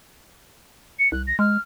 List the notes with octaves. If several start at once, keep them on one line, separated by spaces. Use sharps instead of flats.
C#7
C2 F#6
A#6
G#3 F6